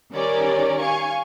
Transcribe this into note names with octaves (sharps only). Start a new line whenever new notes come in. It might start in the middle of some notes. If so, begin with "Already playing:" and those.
D#3 G3 C#4 A#4 D5
F5 G#5 C#6